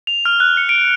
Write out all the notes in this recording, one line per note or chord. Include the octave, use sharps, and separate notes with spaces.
F7
F6
F#6
C#7
D7